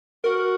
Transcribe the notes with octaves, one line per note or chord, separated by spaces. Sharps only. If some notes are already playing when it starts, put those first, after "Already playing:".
F#4 A#4